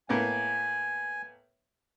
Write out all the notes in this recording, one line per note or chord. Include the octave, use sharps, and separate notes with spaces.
A2 A#3 B3 G#5